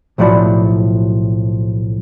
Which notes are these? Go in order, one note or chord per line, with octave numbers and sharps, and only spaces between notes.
B1 A2 F3 F#3 D5 B5